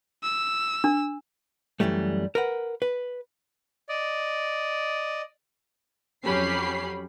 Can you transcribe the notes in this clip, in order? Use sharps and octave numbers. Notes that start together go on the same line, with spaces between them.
E6
D4
F#2 C3 E3 G3 A3
A#4 B4 F#5
B4
D5 D#5
F2 F#3 C#4 G4 B5 C7